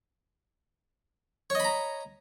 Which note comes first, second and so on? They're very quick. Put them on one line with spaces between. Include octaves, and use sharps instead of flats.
C#5 D#5 B5 A#5